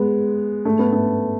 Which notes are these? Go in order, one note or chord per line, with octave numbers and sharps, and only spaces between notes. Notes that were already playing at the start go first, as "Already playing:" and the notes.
Already playing: G#3 B3
A3
B3
A3